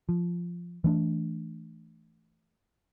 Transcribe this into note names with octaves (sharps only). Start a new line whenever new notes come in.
F3
E3 A3 D4